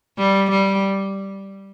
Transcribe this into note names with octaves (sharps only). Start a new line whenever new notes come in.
G3
G3